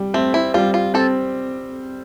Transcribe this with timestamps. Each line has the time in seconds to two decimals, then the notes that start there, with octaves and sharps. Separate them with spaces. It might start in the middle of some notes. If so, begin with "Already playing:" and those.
Already playing: G3
0.14 A3 C4
0.34 E4
0.54 G3 F4
0.74 F4
0.94 C4 A4